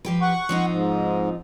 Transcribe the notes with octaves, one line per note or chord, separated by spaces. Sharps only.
F3 G4 B4
F#5 C#6
F3 C4 D#4
G#2